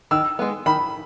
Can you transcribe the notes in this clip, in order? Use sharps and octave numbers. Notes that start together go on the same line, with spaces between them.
D#3 E6
G#3 B3
D#3 B5